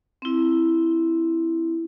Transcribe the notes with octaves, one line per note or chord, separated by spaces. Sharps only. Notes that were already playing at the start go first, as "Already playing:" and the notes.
C4 E4